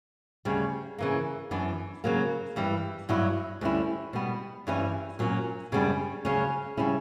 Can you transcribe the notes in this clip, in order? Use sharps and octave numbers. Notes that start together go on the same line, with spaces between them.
D2 C#3 G3
C#3 E3 A#3
F#2 E3 B3 D4
C#3 F#3 A#3
G2 E3 G3
G2 F#3 B3 E4
D2 D3 G3 C#4 E4
B2 G3 B3
G2 E3 G3 C#4 E4
A#2 F#3 C#4
F#2 C#3 G3 B3 D4
D2 C#3 F#3 C#4
C#3 G3 C#4 E4